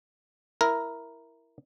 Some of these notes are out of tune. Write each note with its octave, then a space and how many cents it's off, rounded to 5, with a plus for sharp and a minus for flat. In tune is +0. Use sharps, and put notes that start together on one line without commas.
E4 +0 A#4 +0